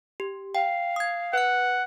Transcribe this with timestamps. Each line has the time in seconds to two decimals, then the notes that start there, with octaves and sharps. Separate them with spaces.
0.20 G4
0.55 F5 G5
0.96 D#6 G#6
1.33 B4 F#5 F#6